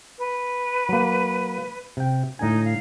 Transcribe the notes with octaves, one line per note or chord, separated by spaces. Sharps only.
B4
F#3 A#3
C3 G5
A2 D3 D#4 G#5
F5